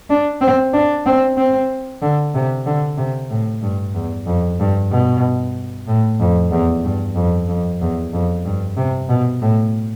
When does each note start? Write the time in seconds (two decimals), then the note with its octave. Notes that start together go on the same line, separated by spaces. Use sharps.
0.10 D4
0.41 C4
0.73 D4
1.06 C4
1.37 C4
2.02 D3
2.34 C3
2.66 D3
2.98 C3
3.30 A2
3.62 G2
3.94 E2
4.26 F2
4.59 G2
4.91 B2
5.87 A2
6.20 F2
6.52 E2
6.84 G2
7.16 F2
7.48 F2
7.81 E2
8.13 F2
8.45 G2
8.77 C3
9.09 B2
9.42 A2